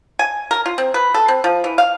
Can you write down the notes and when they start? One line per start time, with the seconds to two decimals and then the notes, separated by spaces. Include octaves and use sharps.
0.19 G#5
0.51 A#4
0.66 F4
0.78 C4
0.94 B4
1.14 A4
1.28 C4
1.44 F3
1.64 E3
1.78 F5